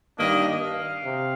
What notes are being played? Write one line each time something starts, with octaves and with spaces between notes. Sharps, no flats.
G2 D#3 A#3 D4 D#5
F5
C3